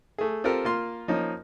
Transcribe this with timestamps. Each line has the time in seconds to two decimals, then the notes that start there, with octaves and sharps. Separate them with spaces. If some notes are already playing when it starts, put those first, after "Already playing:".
0.18 A3 G#4
0.44 C4 F4 G4 A4 A#4
0.65 A#3 F4 C6
1.08 F3 A#3 C#4 D#4